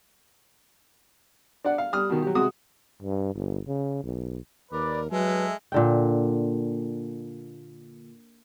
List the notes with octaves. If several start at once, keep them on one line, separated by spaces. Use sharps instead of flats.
D4 D5 F#5
F5
G3 D#6 F6
B2 D#3
F#3 G4
C3 G#3 F#4 D#6
G2
G1
C#3
B1
D#2 A#4 B4 D5
F#3 G#3 A4 B4 E5
A#2 D3 G5